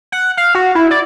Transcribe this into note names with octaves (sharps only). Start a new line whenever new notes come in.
F#5
F5
F#4
E4
D5